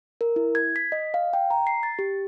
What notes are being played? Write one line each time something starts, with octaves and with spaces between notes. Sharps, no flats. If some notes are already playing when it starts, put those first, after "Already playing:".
A#4
E4
G#6
B6
D#5
F5
G5
A#5
C7
A6
G4